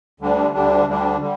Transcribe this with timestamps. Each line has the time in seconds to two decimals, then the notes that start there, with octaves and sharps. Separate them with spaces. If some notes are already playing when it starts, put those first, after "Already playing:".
0.20 D2 D3 G3 D4
0.54 D2 D3 G3 D4
0.86 D2 D3 G3 D4
1.20 D3 G3